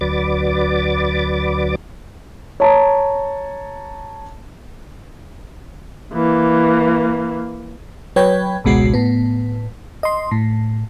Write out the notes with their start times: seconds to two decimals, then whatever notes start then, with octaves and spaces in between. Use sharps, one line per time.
0.01 D2 F#3 B4 D5 D6 A6
2.60 C#5 A5 A#5
6.13 E3 A#3
8.16 F#3 B4 C#5 G5 B5 G#6
8.64 G#1 C#2 B2 G#3 F#4 C7
8.94 A2 B3
10.03 D#5 C6
10.31 A2